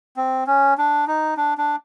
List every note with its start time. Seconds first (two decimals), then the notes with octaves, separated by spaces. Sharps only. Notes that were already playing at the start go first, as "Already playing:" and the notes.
0.17 C4
0.47 C#4
0.78 D4
1.07 D#4
1.37 D4
1.58 D4